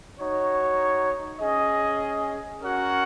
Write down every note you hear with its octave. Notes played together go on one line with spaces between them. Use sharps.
D#4 F#4 C#5
C#4 G#4 D#5
C#4 F#4 A#4 C#5 F#5